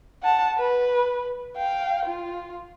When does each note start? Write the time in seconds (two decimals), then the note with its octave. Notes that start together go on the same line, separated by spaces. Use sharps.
0.22 F#5 A5
0.57 B4
1.57 F5 G5
2.05 F4